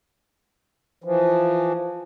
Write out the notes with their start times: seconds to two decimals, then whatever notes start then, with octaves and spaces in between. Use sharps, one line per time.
1.04 E3 F3